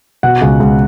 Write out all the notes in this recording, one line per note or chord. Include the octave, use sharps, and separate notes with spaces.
B2 F#5
C#2
C#2